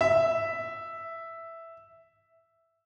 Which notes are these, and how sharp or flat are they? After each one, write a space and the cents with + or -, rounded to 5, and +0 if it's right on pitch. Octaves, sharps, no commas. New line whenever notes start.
E5 +0